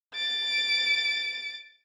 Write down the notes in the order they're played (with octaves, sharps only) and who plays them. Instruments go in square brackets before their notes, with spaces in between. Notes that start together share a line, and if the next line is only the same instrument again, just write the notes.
[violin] A6 D7